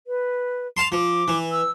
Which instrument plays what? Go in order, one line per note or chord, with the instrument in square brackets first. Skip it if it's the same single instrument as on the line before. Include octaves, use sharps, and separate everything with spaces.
[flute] B4
[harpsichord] F5 A5 C6
[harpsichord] F3 [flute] D6
[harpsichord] E3
[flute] E6